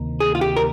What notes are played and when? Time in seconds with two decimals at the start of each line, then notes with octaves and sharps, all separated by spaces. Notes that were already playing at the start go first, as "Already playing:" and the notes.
Already playing: D2 C3 D#3 A#3
0.20 G#4
0.35 F4
0.41 G4
0.56 A#4